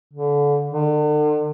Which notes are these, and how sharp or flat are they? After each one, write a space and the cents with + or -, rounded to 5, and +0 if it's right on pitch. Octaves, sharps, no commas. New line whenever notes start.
D3 -30
D3 +40